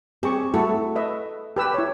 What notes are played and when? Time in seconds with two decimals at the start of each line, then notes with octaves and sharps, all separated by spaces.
0.23 C4 G4 G#4 C#6
0.54 A3 E4 F#4 A4
0.95 B4 D#5 E5
1.56 G4 B4 E6
1.74 E4 C#5